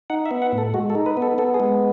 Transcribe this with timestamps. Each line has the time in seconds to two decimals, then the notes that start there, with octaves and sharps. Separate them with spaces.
0.10 D#4 F#5
0.26 E5
0.31 B3
0.42 F#5
0.52 A2
0.58 A4
0.74 G#3 F#4
0.90 A4
0.95 D#4
1.06 B4
1.17 B3
1.22 A4
1.38 B3 A4
1.54 G#4
1.60 G#3